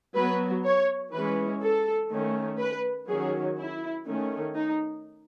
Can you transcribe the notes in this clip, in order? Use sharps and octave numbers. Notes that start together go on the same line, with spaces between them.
F#3 B3 B4
C#5
E3 G#3 C#4 B4
A4
D#3 A3 C#4
B4
D#3 F#3 C#4 G#4
E4
D#3 A3 C#4
D#4